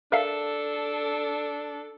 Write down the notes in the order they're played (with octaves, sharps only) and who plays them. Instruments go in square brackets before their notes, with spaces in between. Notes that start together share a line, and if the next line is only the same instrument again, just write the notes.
[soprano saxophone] D4 [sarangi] A4 [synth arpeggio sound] A#4 E5 F5